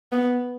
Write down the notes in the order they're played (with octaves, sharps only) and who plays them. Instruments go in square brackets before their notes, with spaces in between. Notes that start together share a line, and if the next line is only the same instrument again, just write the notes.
[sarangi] B3